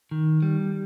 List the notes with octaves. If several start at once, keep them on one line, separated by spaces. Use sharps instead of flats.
D#3
G3